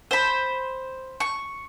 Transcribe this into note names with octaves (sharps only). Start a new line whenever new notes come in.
C5 B5
C#6